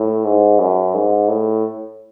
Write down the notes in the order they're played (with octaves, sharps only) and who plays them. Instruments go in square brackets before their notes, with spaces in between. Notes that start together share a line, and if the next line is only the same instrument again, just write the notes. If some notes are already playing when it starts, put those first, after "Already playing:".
Already playing: [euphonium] A2
G#2
F#2
G#2
A2